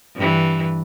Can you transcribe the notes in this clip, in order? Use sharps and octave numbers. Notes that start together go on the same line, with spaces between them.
G2 E3